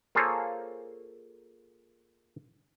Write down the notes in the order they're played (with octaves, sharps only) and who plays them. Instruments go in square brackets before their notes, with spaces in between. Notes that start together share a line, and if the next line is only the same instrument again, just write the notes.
[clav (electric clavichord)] A#3 F4 G#4 A4 C5 C#5